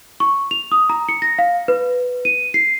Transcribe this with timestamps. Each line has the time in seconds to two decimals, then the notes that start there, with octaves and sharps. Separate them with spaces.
0.20 C#6
0.51 F7
0.72 D#6
0.90 A#5
1.09 C#7
1.22 A#6
1.39 F5
1.68 B4
2.25 D#7
2.54 C7